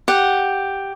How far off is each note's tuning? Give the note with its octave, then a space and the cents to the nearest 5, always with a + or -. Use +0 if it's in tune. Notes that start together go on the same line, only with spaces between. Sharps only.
G4 +0 F#5 +0